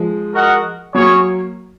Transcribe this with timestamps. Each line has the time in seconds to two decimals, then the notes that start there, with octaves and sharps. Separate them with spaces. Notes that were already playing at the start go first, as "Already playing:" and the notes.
Already playing: F3 G#3
0.33 F#4 A#4 D#5 F#5
0.95 F#3 A#3 C#4 G#4 C#5